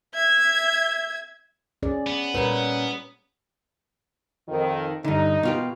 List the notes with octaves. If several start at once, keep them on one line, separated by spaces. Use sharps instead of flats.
E5 G#6
C#4 G#4 D5
B3
A#2 G3 C#4 B4
F2 D#3
G2 D3 D#4
B2 F4 G4